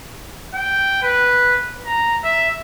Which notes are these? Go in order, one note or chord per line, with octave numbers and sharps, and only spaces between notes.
G5
B4
A#5
E5